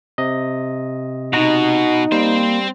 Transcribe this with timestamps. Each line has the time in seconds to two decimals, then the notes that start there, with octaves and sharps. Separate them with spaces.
0.18 C3 D#5
1.33 B2 D#4 F#4 A#5
2.12 G3 A#3 C4 C5